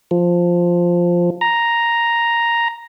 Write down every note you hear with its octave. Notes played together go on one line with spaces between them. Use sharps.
F3
A#5